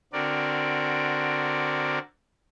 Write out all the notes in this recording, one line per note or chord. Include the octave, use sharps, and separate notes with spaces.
D3 C4 F#4 A#4 D5